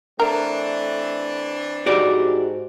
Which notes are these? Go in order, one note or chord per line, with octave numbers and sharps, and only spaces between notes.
E3 A3 C4 D4 A#4
G#2 F#4 G4 D5